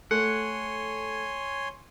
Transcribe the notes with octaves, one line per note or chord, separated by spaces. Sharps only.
A3 C#5 F#5 G#5 C6